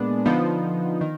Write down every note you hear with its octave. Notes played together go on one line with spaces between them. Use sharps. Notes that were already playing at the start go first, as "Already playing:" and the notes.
Already playing: A#2 G#3 B3 D4
D3 F3 B3 D#4
D#3